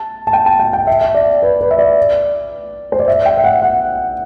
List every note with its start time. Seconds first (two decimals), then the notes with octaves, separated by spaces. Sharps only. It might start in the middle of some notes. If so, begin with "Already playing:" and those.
Already playing: A5
0.27 A5
0.33 G5
0.46 A5
0.59 G5
0.73 G5
0.87 E5
1.01 E5
1.14 D5
1.42 B4
1.61 B4
1.71 E5
1.79 D5
2.92 C5
3.00 D5
3.08 E5
3.25 G5
3.37 E5
3.44 F#5
3.62 F#5